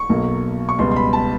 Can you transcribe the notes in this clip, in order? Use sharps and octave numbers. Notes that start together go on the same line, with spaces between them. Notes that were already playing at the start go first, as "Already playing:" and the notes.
Already playing: C#6
B1 B2 F#3 A#3
C#6
C#2 B2 G3 B3 C6
C6
B5
A5